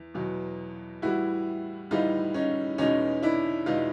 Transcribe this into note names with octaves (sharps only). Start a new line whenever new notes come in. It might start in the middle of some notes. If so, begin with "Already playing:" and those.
Already playing: E2
E2 B2 F#3
A2 E3 G3 E4 F#4
A2 E3 G3 D#4 F4
C#4 D#4
E2 B2 G#3 C#4 D#4
D4 E4
E2 B2 G#3 D#4 F4